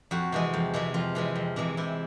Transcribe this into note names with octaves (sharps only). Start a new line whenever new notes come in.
F2 F#4
C3 E3 G#3
F2
C3 E3 G#3
F2 F4
C3 E3 G#3
F2
C3 E3 G#3
C3 E4